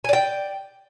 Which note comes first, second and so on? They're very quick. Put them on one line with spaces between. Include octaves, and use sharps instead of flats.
G#5 D5 G5